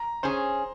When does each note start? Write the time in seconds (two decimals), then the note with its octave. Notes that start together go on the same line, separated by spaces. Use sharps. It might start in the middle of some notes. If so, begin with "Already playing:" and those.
Already playing: A#5
0.23 C#4 G#4 C5